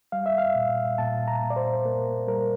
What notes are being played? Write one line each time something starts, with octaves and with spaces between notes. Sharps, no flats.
G3 F5
E5
F5
A#2
A#2 A5
A#5
A#2
D5
C5
A#3 A#4
G3 A#4